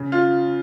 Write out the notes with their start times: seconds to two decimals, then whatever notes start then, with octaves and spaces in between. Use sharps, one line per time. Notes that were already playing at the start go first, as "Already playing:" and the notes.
Already playing: C#3
0.12 F4